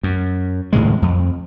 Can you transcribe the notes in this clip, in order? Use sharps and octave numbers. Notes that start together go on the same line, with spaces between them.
F#2
D#1 A2 C#3 G#3
F2